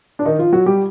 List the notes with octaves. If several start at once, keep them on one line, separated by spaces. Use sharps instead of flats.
D4
D#3 D#4
F3 F4
F#3 F#4
G3 G4